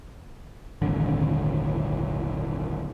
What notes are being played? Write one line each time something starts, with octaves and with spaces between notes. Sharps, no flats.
D#1 G#1 D3